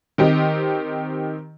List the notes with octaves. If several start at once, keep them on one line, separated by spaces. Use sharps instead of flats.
D#3 C4 G4 D#5